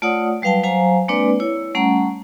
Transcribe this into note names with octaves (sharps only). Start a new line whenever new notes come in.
A3 F4 C#5 D5 F#5 D#6
F#3 G3 B4 F5 G5 A5
F#3 C5 F5 G#5 A#5
G#3 A#3 C4 D4 B4 D5
E4 C#5
G3 A3 C#4 F#5 A#5